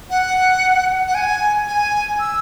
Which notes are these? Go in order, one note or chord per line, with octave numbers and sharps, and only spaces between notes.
F#5
F#5
G#5
G#5
E6